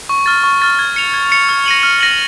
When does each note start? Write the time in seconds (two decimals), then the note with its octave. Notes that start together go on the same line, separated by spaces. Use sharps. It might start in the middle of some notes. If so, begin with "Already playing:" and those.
0.09 C#6
0.26 F6 A6
0.44 C#6
0.62 F6 A6
0.79 G#6
0.96 C#7 F7
1.14 G#6
1.32 C#7 F7
1.49 F6
1.66 A#6 D#7 F#7
1.83 F6
2.01 A#6 D#7 F#7